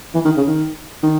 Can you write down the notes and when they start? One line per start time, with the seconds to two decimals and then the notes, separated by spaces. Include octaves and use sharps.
0.15 E3
0.25 D#3
0.37 C#3
0.47 D#3
1.03 D#3